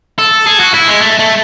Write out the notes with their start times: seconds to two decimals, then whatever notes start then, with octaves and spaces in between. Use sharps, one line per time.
0.19 A4
0.47 G#4
0.60 F#4
0.74 E4
0.88 G#3
1.01 A3
1.19 A3